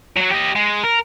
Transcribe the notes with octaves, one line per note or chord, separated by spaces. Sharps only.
F#3 F#4
G4 D#5
G#3
A#4